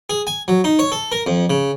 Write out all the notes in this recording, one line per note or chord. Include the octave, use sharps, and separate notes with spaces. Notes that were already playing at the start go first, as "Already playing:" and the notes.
G#4
G#5
F#3
D#4
C#5
A4
A#4
F2
C#3